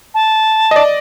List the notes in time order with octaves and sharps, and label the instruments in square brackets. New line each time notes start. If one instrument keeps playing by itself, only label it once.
[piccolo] A5
[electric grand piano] D#5
D5